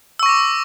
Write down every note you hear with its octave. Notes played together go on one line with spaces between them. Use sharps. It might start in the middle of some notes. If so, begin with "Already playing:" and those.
C#6 D6 E6 A#6